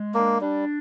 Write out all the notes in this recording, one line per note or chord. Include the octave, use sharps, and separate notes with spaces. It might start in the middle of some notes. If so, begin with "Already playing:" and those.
Already playing: G#3
A#3 D4
G3 D4